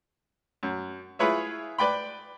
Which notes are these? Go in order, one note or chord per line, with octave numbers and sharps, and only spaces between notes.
F#2
E4 F4 G#4 B4 C#5 E5
B4 D5 G5 B5